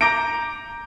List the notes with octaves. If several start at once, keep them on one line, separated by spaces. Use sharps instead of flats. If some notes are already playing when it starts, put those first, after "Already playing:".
A#5 D6 G6 A#6 D7